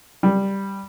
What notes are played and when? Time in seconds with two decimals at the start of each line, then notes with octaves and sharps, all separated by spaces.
0.23 G3